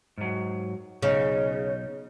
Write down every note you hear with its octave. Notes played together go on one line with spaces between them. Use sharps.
G#2 F#3
B1 C#3 D#4